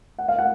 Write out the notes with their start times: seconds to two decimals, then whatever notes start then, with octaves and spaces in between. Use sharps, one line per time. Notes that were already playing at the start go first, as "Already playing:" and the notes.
0.18 F#5
0.28 F5
0.38 F#5